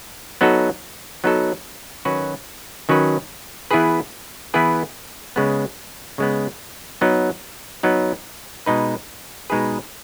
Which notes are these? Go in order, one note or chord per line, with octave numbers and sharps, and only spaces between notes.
F#3 B3 D#4 F#4 A4
F#3 B3 D#4 F#4 A4
D#3 F#3 C#4 F#4 B4
D#3 F#3 C#4 F#4 B4
E3 B3 E4 G#4 B4
E3 B3 E4 G#4 B4
C#3 G#3 B3
C#3 G#3 B3
F#3 B3 D#4
F#3 B3 D#4
B2 G#3 D#4 G#4 B4
B2 G#3 D#4 G#4 B4